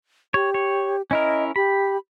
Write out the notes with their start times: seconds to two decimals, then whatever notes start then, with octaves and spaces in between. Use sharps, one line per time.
0.34 G4 C#5
0.54 C#5
1.11 C#4 E4 A#4 D#5
1.56 G4 B5